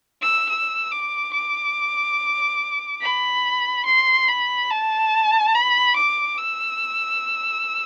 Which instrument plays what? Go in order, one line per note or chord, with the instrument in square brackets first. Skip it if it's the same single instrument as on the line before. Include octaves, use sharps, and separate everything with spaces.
[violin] E6
E6
D6
D6
B5
C6
B5
A5
B5
D6
E6